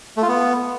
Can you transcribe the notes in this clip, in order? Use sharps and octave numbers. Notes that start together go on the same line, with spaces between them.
A3
F4
B3